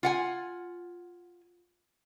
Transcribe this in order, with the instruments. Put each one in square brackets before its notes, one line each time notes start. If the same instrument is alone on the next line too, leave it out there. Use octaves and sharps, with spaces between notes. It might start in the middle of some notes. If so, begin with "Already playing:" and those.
[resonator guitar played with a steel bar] F4 F#5 G#5